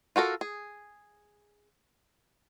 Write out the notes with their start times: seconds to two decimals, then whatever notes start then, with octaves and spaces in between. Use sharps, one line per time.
0.16 F4 F#4 A4 A#4
0.41 G#4